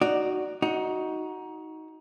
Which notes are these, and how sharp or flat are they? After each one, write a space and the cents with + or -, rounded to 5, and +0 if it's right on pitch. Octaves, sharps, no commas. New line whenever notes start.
D#4 +0 F#4 +5 D5 +0
D#4 +20 F#4 +0